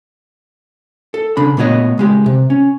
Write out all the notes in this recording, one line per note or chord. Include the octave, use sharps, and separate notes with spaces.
A4
C#3 D4 B5
A#2 A3 B3 C#5 D#5
C#2 G#3 G4
C3
C#4